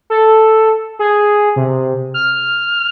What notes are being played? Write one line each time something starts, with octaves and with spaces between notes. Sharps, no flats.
A4
G#4
C3
F6